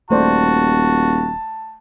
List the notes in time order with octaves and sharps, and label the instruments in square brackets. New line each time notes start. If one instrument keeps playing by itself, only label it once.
[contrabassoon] D#1 [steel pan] A3 C5 D5 [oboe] F#4 [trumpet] A5